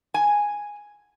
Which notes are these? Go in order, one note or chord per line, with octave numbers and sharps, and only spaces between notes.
G#5